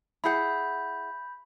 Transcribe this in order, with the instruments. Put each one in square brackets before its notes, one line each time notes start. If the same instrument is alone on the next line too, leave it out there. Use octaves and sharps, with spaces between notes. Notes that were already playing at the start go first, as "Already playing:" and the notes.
[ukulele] E4 G#4 F#5 [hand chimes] B5 G6